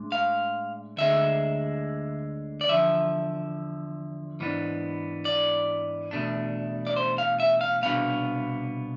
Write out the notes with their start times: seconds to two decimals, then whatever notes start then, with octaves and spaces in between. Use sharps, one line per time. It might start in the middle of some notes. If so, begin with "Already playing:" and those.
Already playing: A2 G#3 D4
0.12 F5
0.97 D2 D3 G#3 E5
2.61 D5
2.68 E2 D3 F3 E5
4.40 G#2 E3 B3 D4
5.25 D5
6.11 E2 B2 A3 D4
6.87 D5
6.96 C5
7.18 F5
7.40 E5
7.61 F5
7.82 C2 B2 B3 D4 F5